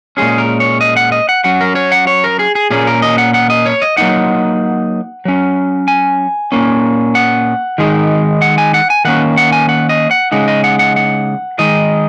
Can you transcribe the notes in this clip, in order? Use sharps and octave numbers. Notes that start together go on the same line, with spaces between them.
A#2 G#3 C#4 G#4
A#4
C#5
D#5
F#5
D#5
F#5
F#3 C#4 F#5
A#4
C#5
F#5
C#5
A#4
G#4
G#4
A#2 A#3 C#4 G#4
A#4
D#5
F#5
F#5
D#5
C#5
D#5
F#3 A#3 D#4 F#5
F#3 C#4
G#5
A#2 A#3 C#4
F#5
D#3 G#3 D#4
F#5
G#5
F#5
G#5
D#3 A#3 C#4 F#5
F#5
G#5
F#5
D#5
F#5
C#3 G#3 D#4 F#5
D#5
F#5
F#5
F#5
D#3 G#3 D#4 D#5